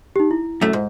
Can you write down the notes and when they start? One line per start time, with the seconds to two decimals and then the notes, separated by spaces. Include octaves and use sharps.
0.16 D#4 G4
0.31 E4
0.61 F#2 A3
0.73 G#2